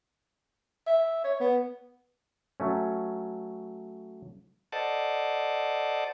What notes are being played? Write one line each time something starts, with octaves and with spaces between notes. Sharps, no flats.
E5
C#5
B3
F#3 A3 C#4
A4 C5 D5 D#5 F#5 A5